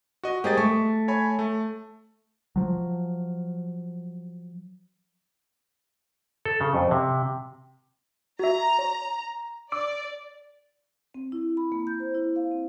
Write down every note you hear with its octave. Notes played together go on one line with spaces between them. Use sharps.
F#4 D#5
A#3 G4 G#4 C5 D#5 A6
A3 C#6
C#5 G#5 B5
A3
F3 F#3
A4
C#3
F2
C3
F#4 E5 A#5
C#5
D5 D6 E6 D7
C4
E4
B5
A#3
G6
C5
E4
F5
C4